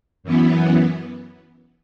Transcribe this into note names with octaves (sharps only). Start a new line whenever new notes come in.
F#2 E3 B3